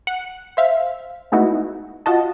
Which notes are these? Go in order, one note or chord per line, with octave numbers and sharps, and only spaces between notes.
F#5
C5 E5 F5
G#3 A3 B3 D#4 E4 F#4
F4 F#4 D#5 A5